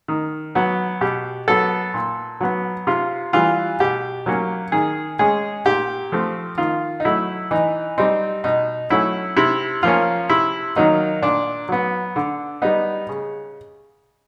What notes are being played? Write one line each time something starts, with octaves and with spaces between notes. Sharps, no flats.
D#3
F#3 B3
B2 G4
F#3 B3 A4
A#2
F#3 B3
C3 F4
E3 G3 F4
B2 G4
F#3 A#3 C#4
D#3 G#4
G#3 C#4 G#4
A#2 G4
F3 A3 C4
D#3 F4
D#4
F#3 A3 E4
E3 D#4
G3 C4 D#4
B2 D#4
F#3 A3 C#4 E4
C3 E4
F3 A#3 C#4 F4
C3 E4
D#3 F#3 A#3 D#4
A#2 D4
F#3 B3
D3
G3 B3 D#4
C#3